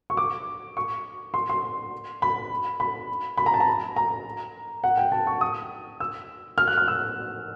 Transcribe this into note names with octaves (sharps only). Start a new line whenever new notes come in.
C#6
D6
C#6
C6
C6
B5
B5
B5
A#5
A5
A#5
A#5
F#5
G5
A5
C#6
D#6
E6
F6
F#6
F6
E6